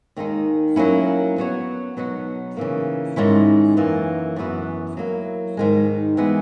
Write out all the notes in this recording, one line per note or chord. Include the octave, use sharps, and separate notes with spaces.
D#2 D#3 G#3 D#4
F#3 A#3 C#4 E4
F#3 B3 F#4 C#5
B2 F#3 B3 D#4 F#4
C#3 E3 A#3
G#2 D#3 G#3 C#4 E4
F#2 E3 A#3
F#2 E3 B3 F#4
F#3 A#3 E4
G#2 D#3 G#3
E3 G#3 B3